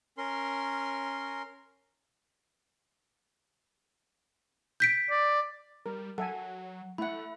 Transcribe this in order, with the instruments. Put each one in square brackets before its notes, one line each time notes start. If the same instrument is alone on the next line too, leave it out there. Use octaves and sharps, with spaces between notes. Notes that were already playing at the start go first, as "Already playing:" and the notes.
[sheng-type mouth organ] C#4 A#4 C6
[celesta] G6 B6 D7
[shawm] D5
[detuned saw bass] G3 [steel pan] A#4
[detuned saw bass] F#3 [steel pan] A4 E5 G#5 [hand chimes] F#5
[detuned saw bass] A3 [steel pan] E4 F#5 [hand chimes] E5 B5